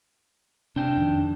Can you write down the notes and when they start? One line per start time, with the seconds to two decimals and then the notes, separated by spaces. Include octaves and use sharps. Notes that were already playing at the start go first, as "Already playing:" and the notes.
0.76 C3 D4 G5
0.97 F2 D#3